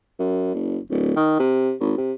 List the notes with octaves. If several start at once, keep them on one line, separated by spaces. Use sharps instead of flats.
F#2
F#1
D1
D#3
C3
G#1
C3